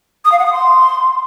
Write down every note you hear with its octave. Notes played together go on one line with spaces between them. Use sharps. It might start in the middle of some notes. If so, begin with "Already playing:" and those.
D#6
F5
F#5
D#6
C6